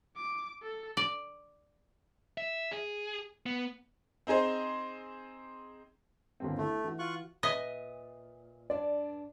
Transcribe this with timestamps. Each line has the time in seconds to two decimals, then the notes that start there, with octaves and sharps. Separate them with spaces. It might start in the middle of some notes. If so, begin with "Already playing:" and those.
0.17 D6
0.63 A4
0.97 D5
2.38 E5
2.71 G#4
3.46 B3
4.27 C4 D#4 G#4 C5
6.40 G1 D#2 C4
6.58 A3 E4
6.84 E3 F#4
6.99 F4 C#6 F#6
7.43 A#2 B4 D#5 E5 D#6
8.70 G2 D4 D5